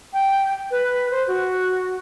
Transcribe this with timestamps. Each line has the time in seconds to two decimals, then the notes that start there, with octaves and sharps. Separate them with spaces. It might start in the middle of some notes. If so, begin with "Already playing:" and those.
0.13 G5
0.71 B4
1.11 C5
1.27 F#4